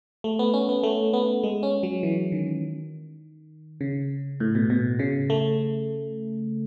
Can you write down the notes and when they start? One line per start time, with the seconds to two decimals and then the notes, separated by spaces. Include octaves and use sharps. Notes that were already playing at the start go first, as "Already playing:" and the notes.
0.24 A3
0.39 B3
0.54 C#4
0.69 B3
0.83 A3
1.13 B3
1.43 G#3
1.63 C#4
1.83 F#3
2.03 E3
2.32 D#3
3.81 C#3
4.40 A2
4.55 B2
4.70 B2
4.99 C#3
5.30 A3